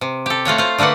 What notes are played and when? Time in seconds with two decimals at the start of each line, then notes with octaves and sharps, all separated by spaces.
0.01 C3
0.26 G4 A4
0.45 A3 F4 F#4 C#5
0.58 F4 C5
0.78 D3 A3 A#3 B4 F#5